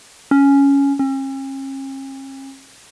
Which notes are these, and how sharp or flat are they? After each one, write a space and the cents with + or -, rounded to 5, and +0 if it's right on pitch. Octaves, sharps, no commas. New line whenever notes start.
C#4 +5
C#4 -45